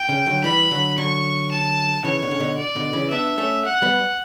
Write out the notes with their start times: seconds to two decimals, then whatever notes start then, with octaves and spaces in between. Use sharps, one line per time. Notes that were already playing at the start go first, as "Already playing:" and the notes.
Already playing: G5
0.09 C#3
0.26 D3 F#3
0.44 E3 G3 B5
0.71 D3 F#3
0.98 D3 F#3 C#6
1.52 A5
2.04 C#3 E3 C#5
2.22 B2 D3
2.31 C#3
2.40 B2 D3
2.57 D5
2.76 B2 D3
2.93 C#3 E3
3.11 B3 D4 E5
3.38 A3 C#4
3.65 F#5
3.82 G3 B3